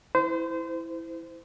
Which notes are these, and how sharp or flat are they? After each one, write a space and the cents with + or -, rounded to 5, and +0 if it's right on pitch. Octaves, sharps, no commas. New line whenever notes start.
E4 +0 C5 -30